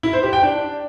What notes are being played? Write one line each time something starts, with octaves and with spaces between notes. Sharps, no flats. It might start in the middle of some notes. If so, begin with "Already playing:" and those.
E4
C5
G4
G5
D4